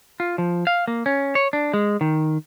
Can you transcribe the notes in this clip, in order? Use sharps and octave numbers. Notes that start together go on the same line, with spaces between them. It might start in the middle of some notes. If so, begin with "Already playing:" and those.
F4
F3
F5
A#3
C#4
C#5
D4
G#3
D#3